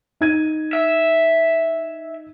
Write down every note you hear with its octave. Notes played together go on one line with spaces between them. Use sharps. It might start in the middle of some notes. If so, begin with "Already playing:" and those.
D#4 G#6 D#7
E5